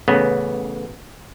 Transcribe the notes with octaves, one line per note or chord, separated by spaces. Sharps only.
A1 C#3 B3